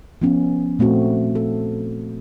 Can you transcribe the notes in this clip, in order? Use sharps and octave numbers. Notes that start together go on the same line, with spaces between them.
F3 B3 C#4
A#2 A3 C4 F#4
A4